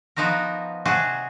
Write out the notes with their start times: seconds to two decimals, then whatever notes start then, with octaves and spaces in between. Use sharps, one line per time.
0.16 F3 B3 D#4 F#4 A#4
0.86 C3 F#3 F#4 G#4 A5